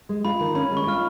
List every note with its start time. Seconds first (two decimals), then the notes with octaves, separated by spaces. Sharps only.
0.09 G#3
0.25 F4 B5
0.40 D#3
0.55 C#4 B5
0.71 G#3
0.77 C#6
0.87 F4 F6